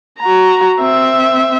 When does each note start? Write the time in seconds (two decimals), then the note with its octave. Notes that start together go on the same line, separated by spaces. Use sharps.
0.20 F#4 A#5
0.79 C4 E5